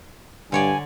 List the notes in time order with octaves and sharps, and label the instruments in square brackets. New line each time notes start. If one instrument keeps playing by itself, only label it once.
[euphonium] G2 [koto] D3 C#5 D5 [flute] G#5